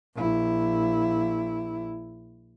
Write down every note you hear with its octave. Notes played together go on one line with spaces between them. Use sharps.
A#1 E4